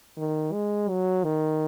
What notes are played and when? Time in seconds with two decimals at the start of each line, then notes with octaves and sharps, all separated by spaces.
0.17 D#3
0.53 G#3
0.89 F#3
1.24 D#3